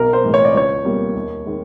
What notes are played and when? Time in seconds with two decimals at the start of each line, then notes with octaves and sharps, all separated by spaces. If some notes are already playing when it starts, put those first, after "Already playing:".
Already playing: B1 A#4
0.13 C5
0.24 A2 E3 G#3
0.34 C#5
0.45 D5
0.54 C#2 C#5
0.85 B2 G3 A#3
1.15 D#2
1.46 D#3 G#3